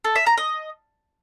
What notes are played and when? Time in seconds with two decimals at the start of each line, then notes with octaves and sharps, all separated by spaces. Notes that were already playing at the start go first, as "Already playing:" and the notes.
0.04 A4
0.15 E5
0.27 A#5
0.38 D#5